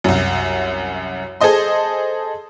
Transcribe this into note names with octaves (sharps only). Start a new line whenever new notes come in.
C2 F#2
G#4 A4 C5 D#5 C6